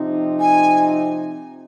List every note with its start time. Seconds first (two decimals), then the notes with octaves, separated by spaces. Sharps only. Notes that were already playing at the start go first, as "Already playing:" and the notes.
Already playing: C3 F3 C4 D#4
0.40 G#5